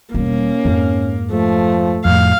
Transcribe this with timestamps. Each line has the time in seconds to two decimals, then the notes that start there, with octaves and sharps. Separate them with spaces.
0.14 E1 G3 A#3 C#4
0.65 F2 G#2
1.32 F3 A3
2.05 F2 A2 F5